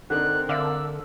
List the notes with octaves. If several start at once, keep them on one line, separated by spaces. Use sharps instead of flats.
D3 C4 D4 D#4 A#4 F#6
D3 D5 E5 F5 E6